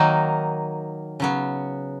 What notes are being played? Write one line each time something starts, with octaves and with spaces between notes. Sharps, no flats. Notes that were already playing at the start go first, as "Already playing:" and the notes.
Already playing: D#3 F#3 A#3 D#4
C#3 F#3 B3